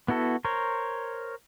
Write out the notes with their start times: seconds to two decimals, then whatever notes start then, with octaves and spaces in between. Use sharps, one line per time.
0.08 B3 E4 F#4 A4
0.45 A#4 C5 C#5